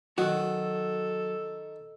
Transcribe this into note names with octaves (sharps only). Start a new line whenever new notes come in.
D#3 F#3 F#4 A4